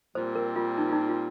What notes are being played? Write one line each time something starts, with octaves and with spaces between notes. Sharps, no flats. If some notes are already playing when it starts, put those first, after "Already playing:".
A#2 G3 C4 C5
A#4
F4
D#4
F4
D#4
F4